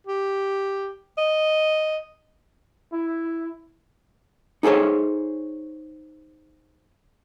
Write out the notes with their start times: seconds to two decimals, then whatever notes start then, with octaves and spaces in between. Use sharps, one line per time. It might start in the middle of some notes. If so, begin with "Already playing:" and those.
0.07 G4
1.18 D#5
2.93 E4
4.63 D#4 G#4 A4 C5 C#5